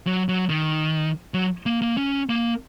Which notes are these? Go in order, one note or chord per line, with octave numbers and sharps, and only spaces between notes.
F#3
F#3
D#3
F#3
A#3
A#3
C#4
A#3